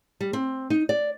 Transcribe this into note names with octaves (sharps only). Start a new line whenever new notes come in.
G3
C4
D#4
D5